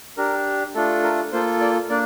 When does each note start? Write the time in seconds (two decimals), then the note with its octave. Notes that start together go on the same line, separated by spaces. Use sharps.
0.17 D4 G4 A#4
0.74 A3 D4 F4 A4
1.03 A#4
1.32 A#3 F4 A4 C5
1.61 D5
1.89 A#3 D4 D5